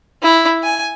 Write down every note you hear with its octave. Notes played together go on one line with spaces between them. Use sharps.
E4
G#5